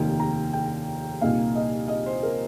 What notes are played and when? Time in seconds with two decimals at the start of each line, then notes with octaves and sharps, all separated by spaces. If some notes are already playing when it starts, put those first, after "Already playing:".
Already playing: F1 D#2 D#3 A#3 G5
0.20 A#5
0.53 G5
1.21 C2 A#2 A#3 D#4 F5
1.55 D#5
1.88 D#5
2.06 C5
2.23 A#4